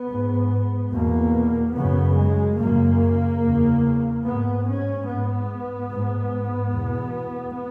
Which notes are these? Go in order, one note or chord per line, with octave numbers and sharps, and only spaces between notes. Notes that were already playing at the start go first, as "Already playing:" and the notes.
Already playing: B3
G#2
E2 B2 A#3
F#2 C#3 B3
G#3
F#2 C#3 A#3
E2 C#3
G#2 B3
C#4
G#2 B3
G#2
E2 B2